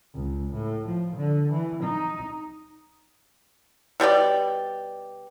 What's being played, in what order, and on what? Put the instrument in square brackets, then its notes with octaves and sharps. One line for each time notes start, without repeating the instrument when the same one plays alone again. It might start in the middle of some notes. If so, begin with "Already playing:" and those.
[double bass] C#2
A2
F3
D3
E3
D#4
[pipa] B2 G3 G4 D5